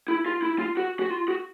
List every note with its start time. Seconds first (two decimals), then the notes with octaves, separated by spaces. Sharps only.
0.08 E4
0.26 F4
0.42 E4
0.59 F4
0.77 F#4
0.99 F#4
1.10 F4
1.28 F#4